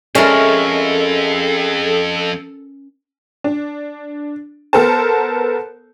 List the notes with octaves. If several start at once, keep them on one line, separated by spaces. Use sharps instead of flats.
F2 G#3 C#4 E4 A4 A#4
D4
B3 A4 A#4 C5 A5